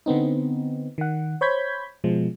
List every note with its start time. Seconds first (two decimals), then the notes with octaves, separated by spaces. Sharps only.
0.06 D3 B3 C4 D#4
0.98 D#3 F#5
1.41 C5 C#5 B5 G6 G#6 B6
2.04 B2 F3 G#3